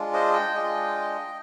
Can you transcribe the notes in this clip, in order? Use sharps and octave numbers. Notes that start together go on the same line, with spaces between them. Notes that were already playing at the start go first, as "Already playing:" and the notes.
Already playing: G#3 D4 F4
C5 D#5
D#5 G5
G#3 D4 F4